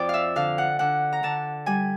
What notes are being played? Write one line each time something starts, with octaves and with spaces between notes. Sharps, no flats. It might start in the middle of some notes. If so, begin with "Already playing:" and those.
Already playing: F2 D5
E5 F5
D3 F5
F#5
D3 F#5
A#5
D3 A5
G3 G#5